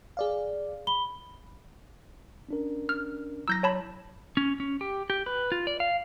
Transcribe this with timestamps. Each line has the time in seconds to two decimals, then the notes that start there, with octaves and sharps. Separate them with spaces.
0.17 G#4 D5 F5
0.87 B5 G7
2.49 C#4 D4 A#4
2.89 F6
3.48 F#3 E4 A#5 E6 G6 A#6
3.63 C#5 A5 B5
4.37 C#4
4.60 C#4
4.81 G4
5.10 G4
5.26 B4
5.52 F4
5.67 D5
5.80 F5